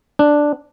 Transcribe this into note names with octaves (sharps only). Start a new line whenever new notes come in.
D4